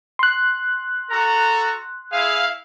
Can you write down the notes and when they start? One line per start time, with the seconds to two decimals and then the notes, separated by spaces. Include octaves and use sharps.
0.19 C6 F#6
1.10 F#4 A4 A#5
2.12 E4 G#4 F5